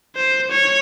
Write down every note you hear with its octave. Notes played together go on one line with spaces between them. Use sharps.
C5
C#5